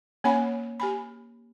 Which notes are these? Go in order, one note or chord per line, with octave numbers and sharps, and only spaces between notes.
A#3 C#4 C#5 F#5 G#5 B5
G4 G#5 B5